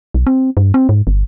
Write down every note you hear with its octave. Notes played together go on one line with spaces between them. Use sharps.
B1
C4
G2
C4
G#2
G1